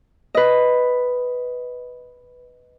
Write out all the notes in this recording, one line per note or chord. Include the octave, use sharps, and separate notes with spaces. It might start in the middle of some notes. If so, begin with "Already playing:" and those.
B4 D#5